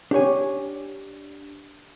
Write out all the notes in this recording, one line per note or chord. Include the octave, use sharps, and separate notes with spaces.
D4 G4 C#5 G#5